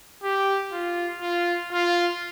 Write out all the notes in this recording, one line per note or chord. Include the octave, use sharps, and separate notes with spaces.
G4
F4
F4
F4